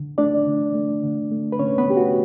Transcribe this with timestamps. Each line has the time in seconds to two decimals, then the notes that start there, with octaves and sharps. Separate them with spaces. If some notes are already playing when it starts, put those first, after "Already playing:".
Already playing: D3
0.18 A3 D4 D5
0.47 D3
0.75 A3
1.03 D3
1.31 A3
1.52 B4
1.59 D3 C#4 C#5
1.78 B3 B4
1.88 A3 G4
1.97 F#4